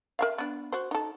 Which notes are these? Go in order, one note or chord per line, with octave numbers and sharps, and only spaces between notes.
A#4 E5 F5
B3 D4
F#4 C5
D#4 A4